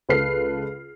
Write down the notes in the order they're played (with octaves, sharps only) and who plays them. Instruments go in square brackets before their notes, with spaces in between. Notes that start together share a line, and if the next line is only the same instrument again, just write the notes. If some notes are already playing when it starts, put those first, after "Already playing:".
[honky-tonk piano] C#2 A4 B4 F6 C7